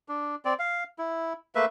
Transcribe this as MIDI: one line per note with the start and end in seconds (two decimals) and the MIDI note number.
0.08 0.35 62
0.45 0.54 60
0.45 0.54 74
0.59 0.84 77
0.99 1.33 64
1.55 1.65 57
1.55 1.65 58
1.55 1.65 71
1.55 1.65 76